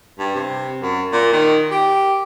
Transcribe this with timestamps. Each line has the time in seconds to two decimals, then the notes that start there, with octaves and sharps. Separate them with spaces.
0.19 G2
0.35 C3
0.82 F#2
1.12 A#2
1.33 D#3
1.71 G4